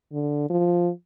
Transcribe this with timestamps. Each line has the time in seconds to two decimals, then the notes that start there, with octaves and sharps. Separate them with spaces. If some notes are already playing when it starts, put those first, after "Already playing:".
0.13 D3
0.50 F3